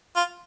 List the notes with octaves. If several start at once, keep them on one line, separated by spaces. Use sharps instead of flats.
F4